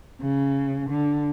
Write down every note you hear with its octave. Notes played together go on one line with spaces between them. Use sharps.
C#3
D3